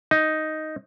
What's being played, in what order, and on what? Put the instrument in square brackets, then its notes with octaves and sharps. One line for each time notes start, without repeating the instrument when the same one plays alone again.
[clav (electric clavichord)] D#4